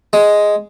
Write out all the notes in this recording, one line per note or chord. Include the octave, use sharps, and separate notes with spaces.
G#3